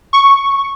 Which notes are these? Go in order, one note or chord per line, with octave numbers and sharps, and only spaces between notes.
C#6